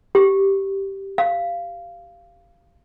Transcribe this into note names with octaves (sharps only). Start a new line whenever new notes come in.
G4
F5